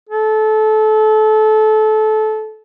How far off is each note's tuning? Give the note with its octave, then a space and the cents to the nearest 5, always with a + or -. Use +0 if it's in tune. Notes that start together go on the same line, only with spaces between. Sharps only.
A4 -25